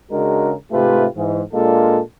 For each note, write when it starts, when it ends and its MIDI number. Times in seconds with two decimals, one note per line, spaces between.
0.11 0.52 49
0.11 0.52 56
0.11 0.52 62
0.11 0.52 66
0.11 0.52 70
0.72 1.06 44
0.72 1.06 48
0.72 1.06 57
0.72 1.06 65
0.72 1.06 67
0.72 1.06 71
1.16 1.42 44
1.16 1.42 52
1.53 1.99 46
1.53 1.99 56
1.53 1.99 58
1.53 1.99 62
1.53 1.99 65
1.53 1.99 69